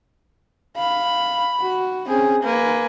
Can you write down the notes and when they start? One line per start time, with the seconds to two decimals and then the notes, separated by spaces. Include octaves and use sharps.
0.77 F5 B5
1.61 F#4
2.08 C4 C#4 G#4
2.44 A#3 B4 G#5